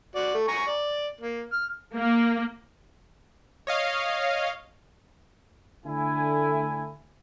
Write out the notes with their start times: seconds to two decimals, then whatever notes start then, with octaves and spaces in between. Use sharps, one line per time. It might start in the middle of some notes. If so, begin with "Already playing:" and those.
0.16 F#4 D5
0.34 A3
0.48 G#5 A#5 C#6
0.67 D5
1.20 A#3
1.52 F6
1.96 A#3
3.67 C#5 D#5 F5
5.85 D3 A3 E4 G#5